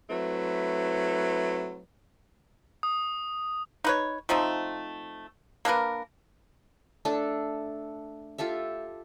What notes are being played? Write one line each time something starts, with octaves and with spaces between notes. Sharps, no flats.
F#3 A3 C4 E4 B4
D#6
D#4 B4 C#5
F3 A3 C4 D#4
A#3 D4 A#4 B4
A3 D4 A4 D5
F4 G4 A4 E5